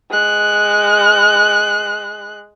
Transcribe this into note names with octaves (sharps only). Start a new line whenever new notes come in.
G#3 F#6